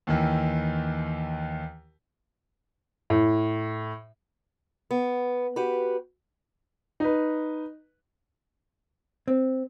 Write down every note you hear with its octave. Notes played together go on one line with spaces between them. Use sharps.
D#2 D#3 E3
A2
B3
F#4 G4 B4
D#4 B4
C4